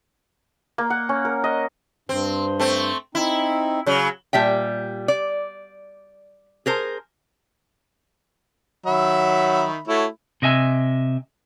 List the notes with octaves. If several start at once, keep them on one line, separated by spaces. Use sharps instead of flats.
A#3
F#5
C#4
A#4
D#5
G2 C4
A3 C4
C4 D#4 E4
C#3 F#3
A#2 G3 E5 G5
D5
G#4 A#4 C5
D#3 F#3 E5 B5
A3 E4 F#4 C#5
C3 D#5 E5 G#5